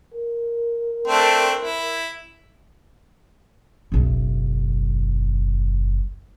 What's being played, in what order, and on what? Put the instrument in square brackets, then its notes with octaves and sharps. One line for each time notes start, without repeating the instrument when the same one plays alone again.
[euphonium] A#4
[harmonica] A3 C4 D4
E4
[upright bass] F#1 B1